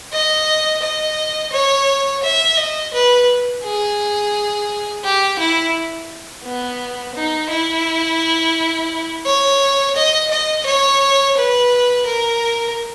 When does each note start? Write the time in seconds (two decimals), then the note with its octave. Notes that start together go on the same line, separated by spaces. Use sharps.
0.13 D#5
0.83 D#5
1.53 C#5
2.23 E5
2.58 D#5
2.94 B4
3.64 G#4
5.04 G4
5.39 E4
6.44 B3
7.15 D#4
7.50 E4
9.26 C#5
9.96 D#5
10.31 D#5
10.66 C#5
11.37 B4
12.07 A#4